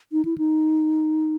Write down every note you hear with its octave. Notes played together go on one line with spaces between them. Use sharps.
D#4
E4
D#4